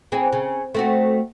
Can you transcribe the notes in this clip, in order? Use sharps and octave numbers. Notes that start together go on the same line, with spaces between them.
E3 C4 G#4
C#3
A3 C4 F#4